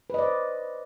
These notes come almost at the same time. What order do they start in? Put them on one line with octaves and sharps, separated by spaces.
B4 D#5 D5 C5